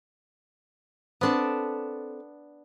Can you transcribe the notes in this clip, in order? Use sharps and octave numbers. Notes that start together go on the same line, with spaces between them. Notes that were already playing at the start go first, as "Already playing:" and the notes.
B3 C4 D4 A4 A5